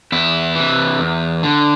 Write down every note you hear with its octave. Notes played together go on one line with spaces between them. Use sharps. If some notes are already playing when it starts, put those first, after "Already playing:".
E2 E4
C3 E3
E2
D3